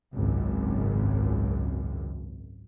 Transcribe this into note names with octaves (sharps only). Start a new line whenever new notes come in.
G#1 C#2 F#2